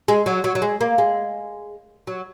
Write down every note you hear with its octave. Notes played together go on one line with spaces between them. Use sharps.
G#3
F#3
F#3
F#3
G#3
A#3
G#3
F#3